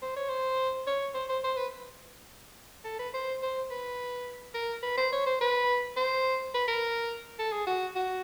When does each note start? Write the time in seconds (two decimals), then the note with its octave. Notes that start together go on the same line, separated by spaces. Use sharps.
0.02 C5
0.16 C#5
0.29 C5
0.87 C#5
1.14 C5
1.29 C5
1.44 C5
1.57 B4
2.84 A4
2.99 B4
3.14 C5
3.42 C5
3.70 B4
4.54 A#4
4.83 B4
4.97 C5
5.12 C#5
5.26 C5
5.41 B4
5.96 C5
6.54 B4
6.68 A#4
7.39 A4
7.52 G#4
7.67 F#4
7.95 F#4